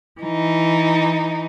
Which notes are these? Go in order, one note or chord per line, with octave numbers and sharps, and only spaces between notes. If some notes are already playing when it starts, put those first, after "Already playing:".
E3 D#4